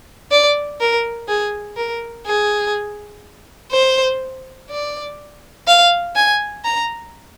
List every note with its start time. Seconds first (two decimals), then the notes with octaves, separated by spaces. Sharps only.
0.31 D5
0.80 A#4
1.28 G#4
1.77 A#4
2.26 G#4
3.72 C5
4.70 D5
5.67 F5
6.16 G#5
6.64 A#5